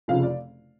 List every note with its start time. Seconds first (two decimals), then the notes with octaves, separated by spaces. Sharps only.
0.08 F1 F2 C#3 F5
0.23 D5